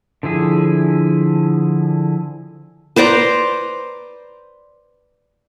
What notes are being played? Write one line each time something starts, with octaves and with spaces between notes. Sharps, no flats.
D3 F3 E4 G#4
B4 C5 D5 A#5